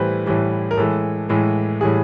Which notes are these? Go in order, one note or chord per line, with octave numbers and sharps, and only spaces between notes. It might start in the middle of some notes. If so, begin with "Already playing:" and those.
Already playing: A2 E3 G3 B4 C5
A2 E3 G3
A#4
A2 E3 G#3 A4
A2 E3 G#3
A2 E3 G3 G#4